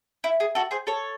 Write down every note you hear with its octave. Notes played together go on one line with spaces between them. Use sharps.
E4
G#4
F#4 A4
G#4 C5
A4 C#5